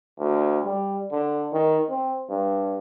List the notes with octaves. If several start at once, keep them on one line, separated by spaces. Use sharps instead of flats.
D2
G3
D3
D#3
C4
G2